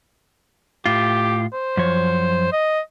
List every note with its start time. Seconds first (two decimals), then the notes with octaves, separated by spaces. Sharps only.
0.86 A2 F4 G4
1.53 C5
1.77 F#2 F3 C#5
2.52 D#5